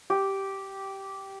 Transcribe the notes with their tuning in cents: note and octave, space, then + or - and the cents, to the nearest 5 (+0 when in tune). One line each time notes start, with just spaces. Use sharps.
G4 -10